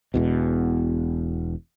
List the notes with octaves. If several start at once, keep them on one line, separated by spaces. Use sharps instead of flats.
E1 E2 B2